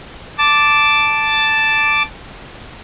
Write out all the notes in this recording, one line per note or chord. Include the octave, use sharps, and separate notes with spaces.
A5 D6